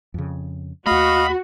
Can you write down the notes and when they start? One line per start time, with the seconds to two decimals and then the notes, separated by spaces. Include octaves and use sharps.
0.14 F2 C#3
0.86 D#2 A3 F#4 D#5 F5 B5